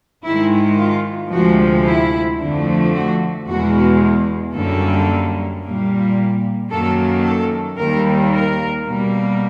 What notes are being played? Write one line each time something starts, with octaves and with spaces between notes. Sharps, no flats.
G#2 D#3 G#3 E4
F4
D2 C3 F3 G#3 F#4
E4
F2 D3 F3 A3
F#4
E2 B2 G#3 F#4
F#2 D3 G3 A#3 A4
A#2 G3 A#3
F#2 D#3 F#3 A#3 A4
A4
D#2 D#3 G3 A#3 A#4
A#4
B2 G3 A#3